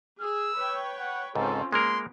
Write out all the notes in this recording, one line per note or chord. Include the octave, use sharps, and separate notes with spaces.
G#4 E6
B4 C#5 G5
F#5
C#2 G#2 C4 C#4 F4 A4
G#3 A#3 B3 A#4 C6